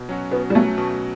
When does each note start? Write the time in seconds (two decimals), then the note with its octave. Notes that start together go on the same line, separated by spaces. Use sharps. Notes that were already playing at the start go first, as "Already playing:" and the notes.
Already playing: B2
0.09 F#3 C#4 F#4
0.31 B2 B3
0.50 G3
0.55 F#3 A3 C#4 F#4
0.78 B2